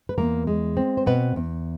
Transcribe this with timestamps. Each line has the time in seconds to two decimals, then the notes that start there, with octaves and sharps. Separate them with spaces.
0.09 B4
0.18 E2 A#3 A#4
0.47 G#3
0.77 C4
0.97 C5
1.06 B2 B3 B4
1.36 E2